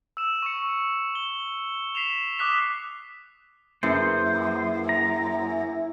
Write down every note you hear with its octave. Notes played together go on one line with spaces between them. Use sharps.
E6 E7
C#6 C#7
G7
B6 C7 E7 F7
D6 D#6 F#6 B6 E7
F#2 A#3 E4 G#4 B4 C5
A#5